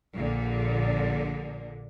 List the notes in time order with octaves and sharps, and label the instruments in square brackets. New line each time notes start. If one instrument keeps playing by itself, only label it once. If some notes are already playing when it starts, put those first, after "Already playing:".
[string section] A#1 A#2 D3